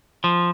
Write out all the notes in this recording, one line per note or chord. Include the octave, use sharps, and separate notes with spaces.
F3